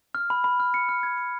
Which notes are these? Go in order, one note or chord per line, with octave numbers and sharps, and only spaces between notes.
F6
B5
B5
F6
C#7
F6
G#6
C#7